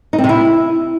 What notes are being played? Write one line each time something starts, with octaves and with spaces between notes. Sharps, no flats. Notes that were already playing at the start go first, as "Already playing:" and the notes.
D#4
C4
C3
E4